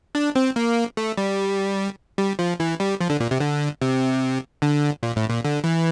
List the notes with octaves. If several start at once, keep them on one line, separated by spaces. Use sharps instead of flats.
D4
C4
A#3
A3
G3
G3
F3
E3
G3
F3
D3
A#2
C3
D3
C3
D3
A#2
A2
A#2
D3
E3